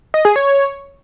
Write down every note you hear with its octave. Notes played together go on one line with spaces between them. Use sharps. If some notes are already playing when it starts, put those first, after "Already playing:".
D#5
G#4
C#5